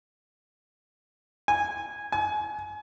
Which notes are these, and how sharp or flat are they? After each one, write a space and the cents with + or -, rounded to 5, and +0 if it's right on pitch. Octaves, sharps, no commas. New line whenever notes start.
G#5 -10
G#5 +30